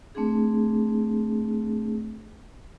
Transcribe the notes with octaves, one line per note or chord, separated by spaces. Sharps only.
A3 C4 D4 G#4